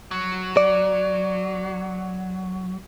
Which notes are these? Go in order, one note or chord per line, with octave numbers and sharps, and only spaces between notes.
F#3
D5